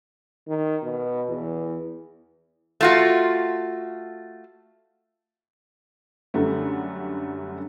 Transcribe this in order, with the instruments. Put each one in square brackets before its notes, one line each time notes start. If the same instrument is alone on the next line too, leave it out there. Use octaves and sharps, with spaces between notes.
[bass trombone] D#3
B2
E2
[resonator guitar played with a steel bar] A3 F4 F#4
[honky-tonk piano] F#2 D3 G3 A3